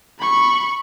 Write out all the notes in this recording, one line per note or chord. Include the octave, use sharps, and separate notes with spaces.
B5 C#6